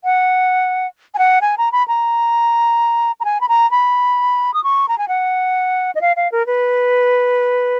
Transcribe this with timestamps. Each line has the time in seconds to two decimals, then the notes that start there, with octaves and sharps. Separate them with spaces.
0.04 F#5
1.14 G#5
1.18 F#5
1.41 G#5
1.58 A#5
1.72 B5
1.88 A#5
3.20 A#5
3.25 G#5
3.41 B5
3.48 A#5
3.71 B5
4.54 D#6
4.64 C#6
4.88 A#5
4.98 G#5
5.08 F#5
5.95 D#5
6.01 F5
6.16 F5
6.32 A#4
6.46 B4